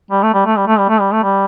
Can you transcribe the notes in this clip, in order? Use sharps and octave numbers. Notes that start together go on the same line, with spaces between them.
G3
A3
G3
A3
G3
A3
G3
A3
G3
A3
G3